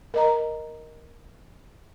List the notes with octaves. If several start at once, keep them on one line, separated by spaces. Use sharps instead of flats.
A#4 D#5 A#5